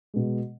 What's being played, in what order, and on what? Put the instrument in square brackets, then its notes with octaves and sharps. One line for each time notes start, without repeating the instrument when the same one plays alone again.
[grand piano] B2 G#3